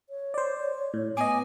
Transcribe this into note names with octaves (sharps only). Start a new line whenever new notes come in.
C#5
C5 D5
A2
B3 D#5 G#5 D6